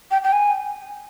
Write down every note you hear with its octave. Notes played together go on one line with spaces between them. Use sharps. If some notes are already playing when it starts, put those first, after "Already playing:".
G5
G5
G#5